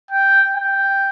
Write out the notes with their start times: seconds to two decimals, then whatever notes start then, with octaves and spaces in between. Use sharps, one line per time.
0.11 G5
0.55 G5